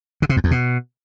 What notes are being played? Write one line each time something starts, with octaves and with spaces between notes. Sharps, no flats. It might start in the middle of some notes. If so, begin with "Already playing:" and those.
D3
C3
F2
E2
B2